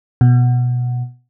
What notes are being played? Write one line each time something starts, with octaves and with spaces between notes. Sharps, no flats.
B2